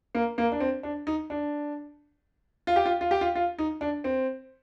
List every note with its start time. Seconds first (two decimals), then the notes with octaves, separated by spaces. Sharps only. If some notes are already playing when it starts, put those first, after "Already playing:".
0.15 A#3
0.38 A#3
0.52 D4
0.60 C4
0.83 D4
1.07 D#4
1.30 D4
2.67 F4
2.76 G4
2.86 F4
3.01 F4
3.11 G4
3.21 F4
3.35 F4
3.58 D#4
3.81 D4
4.04 C4